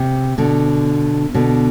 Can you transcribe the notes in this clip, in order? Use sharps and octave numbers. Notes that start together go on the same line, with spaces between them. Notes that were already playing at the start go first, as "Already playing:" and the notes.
Already playing: C3
B2 D3
B2 D3